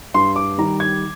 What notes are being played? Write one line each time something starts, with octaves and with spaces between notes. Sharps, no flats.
G2 C6
D6
D#3 G3 A#5
G#6